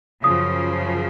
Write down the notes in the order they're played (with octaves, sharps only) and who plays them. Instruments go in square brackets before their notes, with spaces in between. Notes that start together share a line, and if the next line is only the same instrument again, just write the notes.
[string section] F#2 C#3 F3 [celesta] D#6